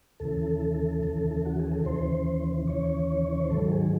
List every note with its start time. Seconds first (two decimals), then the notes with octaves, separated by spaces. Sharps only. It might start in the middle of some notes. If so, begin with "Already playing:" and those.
0.20 D#2 C#3 E3 A4
1.03 D#2 C#3 E3
1.45 F#4
1.60 G#4
1.72 A4
1.85 D#2 C#3 E3 C5
2.68 D#2 C#3 E3 C#5
3.10 C#5
3.32 C#5
3.42 C5
3.50 G#2 D#3 F#3 A4
3.72 G#4